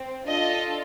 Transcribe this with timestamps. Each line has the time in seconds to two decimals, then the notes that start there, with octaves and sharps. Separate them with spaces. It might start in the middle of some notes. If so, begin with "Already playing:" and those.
Already playing: C4
0.27 D4 F4 A4 D#5